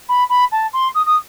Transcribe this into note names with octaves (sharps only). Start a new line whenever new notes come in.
B5
B5
A5
C6
D#6
D#6